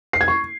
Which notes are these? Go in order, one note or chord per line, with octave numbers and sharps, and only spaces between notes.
C7
G#6
C#6